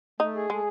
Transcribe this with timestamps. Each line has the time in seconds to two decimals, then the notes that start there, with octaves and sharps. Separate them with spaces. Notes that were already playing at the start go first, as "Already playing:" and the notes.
0.20 A3 D#4
0.35 G#4
0.50 G#3 A3